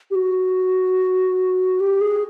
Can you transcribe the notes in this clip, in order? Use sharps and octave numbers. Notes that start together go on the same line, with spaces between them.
G4
F#4
G4
G#4